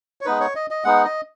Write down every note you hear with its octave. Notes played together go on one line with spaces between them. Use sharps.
C#5
G#3 B3 D#4 B4
C#5
D#5
D#5
G#3 B3 D#4 F#5
D#5